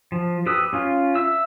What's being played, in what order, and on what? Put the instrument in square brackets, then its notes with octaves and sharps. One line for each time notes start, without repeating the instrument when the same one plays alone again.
[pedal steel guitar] F3
G4 B4 D#6 E6
C#4 F4
E5 E6